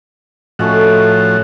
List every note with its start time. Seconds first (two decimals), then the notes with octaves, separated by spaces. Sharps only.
0.59 A2 F3 A3 C#4 F#4 D#5